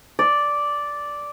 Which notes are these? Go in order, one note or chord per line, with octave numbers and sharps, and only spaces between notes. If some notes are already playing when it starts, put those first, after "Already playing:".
D5